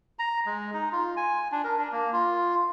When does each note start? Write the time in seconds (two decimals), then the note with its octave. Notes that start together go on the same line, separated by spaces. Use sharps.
0.19 A#5
0.46 G#3
0.74 D#4
0.92 F4
1.17 G#5
1.52 D4
1.64 A#4
1.78 D4
1.92 A#3
2.13 F4